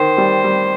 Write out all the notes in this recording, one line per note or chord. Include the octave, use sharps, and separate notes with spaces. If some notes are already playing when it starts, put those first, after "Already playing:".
Already playing: D#3 C5
G3
G3